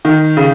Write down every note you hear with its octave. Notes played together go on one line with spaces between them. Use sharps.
D#3
C#3